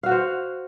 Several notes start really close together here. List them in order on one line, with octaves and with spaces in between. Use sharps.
F5 F#4 F#5 C5